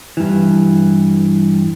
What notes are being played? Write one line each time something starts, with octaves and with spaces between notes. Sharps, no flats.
G2 E3